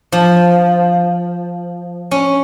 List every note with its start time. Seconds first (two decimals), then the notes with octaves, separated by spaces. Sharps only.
0.12 F3
2.11 C#4